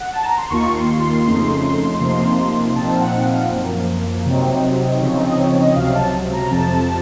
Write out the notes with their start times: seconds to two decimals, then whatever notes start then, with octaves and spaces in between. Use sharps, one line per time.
0.00 F#5
0.13 A5
0.25 A#5
0.38 C6
0.50 D#2 D#3 A#3 F4 C#6
0.76 C6
1.00 C6
1.25 F2 C#3 A3 D#4
2.00 C3 F3 A#3 D#4
2.75 A#2 F3 C4 D#4 A5
2.96 F5
3.01 F#5
3.25 F5
3.51 F#2 F3 A#3
4.26 C3 F#3 C4 D#4
4.92 D#5
5.01 C#3 F3 C4 D#4 C#5
5.20 D#5
5.39 C#5
5.57 D#5
5.76 C#2 C3 F#3 F5
5.95 A5
6.33 A#5
6.51 F2 C3 F3 A5